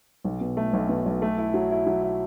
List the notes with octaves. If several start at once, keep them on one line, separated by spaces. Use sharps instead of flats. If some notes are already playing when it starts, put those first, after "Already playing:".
B1
B2
A3
B1
B2
B1
A3
E4
F#3
E4
F#3
E4